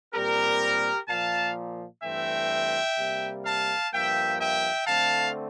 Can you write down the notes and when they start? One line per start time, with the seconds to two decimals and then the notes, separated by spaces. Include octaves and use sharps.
0.13 A#2 G3 C4 G4 A#4
1.08 A#2 F3 A#3 F5 A5
2.03 G2 E3 A3 C4 E5 G5
2.98 C3 G3 A#3
3.45 F5 A5
3.93 G2 F3 A#3 E5 G5
4.41 E5 G5
4.87 D3 A3 C4 F5 A5